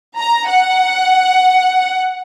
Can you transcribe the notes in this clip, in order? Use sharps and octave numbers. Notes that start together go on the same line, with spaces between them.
A#5
F#5